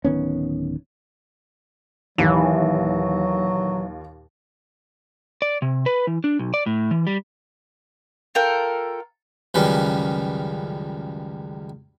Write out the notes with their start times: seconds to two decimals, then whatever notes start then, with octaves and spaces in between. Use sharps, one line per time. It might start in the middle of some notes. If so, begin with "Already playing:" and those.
0.04 D1 D#3 B3 C#4
2.18 D#2 A#2 E3 F#3
5.42 D5
5.62 C3
5.86 B4
6.07 E3
6.24 D4
6.39 B1
6.54 D5
6.66 A2
6.91 E3
7.07 G3
8.35 F4 A4 A#4 G5
9.54 C#2 F#2 D#3 G3 C#4 B4